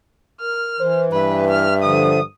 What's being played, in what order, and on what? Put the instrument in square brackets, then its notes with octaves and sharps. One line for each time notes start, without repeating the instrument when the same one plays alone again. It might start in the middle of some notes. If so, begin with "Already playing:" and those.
[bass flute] A#4 [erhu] F6
[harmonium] E3 [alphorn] C5
[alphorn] G2 [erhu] B4 [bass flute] E5
[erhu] F6
[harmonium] D3 F3 [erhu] D#6